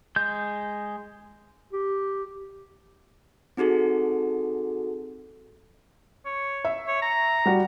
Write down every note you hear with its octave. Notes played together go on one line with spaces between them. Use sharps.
G#3 G6
G4
C4 D#4 F#4 G#4 A4
C#5
E5
C#5
A#5
G3 F#4